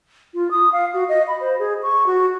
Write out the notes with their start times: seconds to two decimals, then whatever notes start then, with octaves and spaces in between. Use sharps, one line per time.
0.34 F4
0.51 D#6
0.72 F5
0.94 F#4
1.09 D#5
1.28 B5
1.40 C5
1.59 G#4
1.83 C#6
2.07 F#4